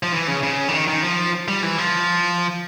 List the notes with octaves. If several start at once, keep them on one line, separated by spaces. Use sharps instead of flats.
F3
E3
C#3
C#3
D3
D#3
D#3
F3
G3
E3
F3